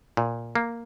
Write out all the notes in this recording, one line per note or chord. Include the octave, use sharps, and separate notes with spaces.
A#2
A#3